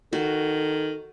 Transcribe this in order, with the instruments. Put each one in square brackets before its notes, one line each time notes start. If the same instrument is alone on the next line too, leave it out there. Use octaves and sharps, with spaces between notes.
[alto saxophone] D#3 [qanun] F#4 [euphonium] A4